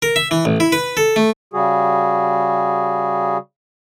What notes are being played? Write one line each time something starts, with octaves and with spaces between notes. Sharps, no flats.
A#4
E5
E3
A1
E4
B4
A4
A3
C#3 G3 F#4 G#4